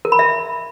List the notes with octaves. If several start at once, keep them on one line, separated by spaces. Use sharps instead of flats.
A#4
B5
E5